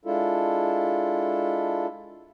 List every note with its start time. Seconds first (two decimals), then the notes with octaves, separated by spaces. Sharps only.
0.05 G#3 D4 E4 F4 A4